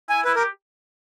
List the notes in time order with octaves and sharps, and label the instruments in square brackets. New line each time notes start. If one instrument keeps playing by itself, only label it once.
[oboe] E4 [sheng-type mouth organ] G#5
[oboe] E4 [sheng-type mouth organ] B4
[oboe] G4 [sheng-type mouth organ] A#4